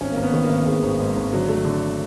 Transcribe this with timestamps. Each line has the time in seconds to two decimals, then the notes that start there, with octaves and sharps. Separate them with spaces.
0.01 G#1 C#4
0.12 G#1 A#3
0.23 B3
0.34 D#3
0.45 G#1 A#3
0.66 G#1 G#3
0.83 G#1
0.99 G#2
1.16 G#1
1.33 D3 F#3
1.49 A3
1.65 D3